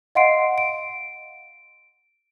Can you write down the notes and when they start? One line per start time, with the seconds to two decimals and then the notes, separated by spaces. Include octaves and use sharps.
0.15 D#5 F5 F#5 C6 C7 D7
0.58 D7